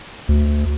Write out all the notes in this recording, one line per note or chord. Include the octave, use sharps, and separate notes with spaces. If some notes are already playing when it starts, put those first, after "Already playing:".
D2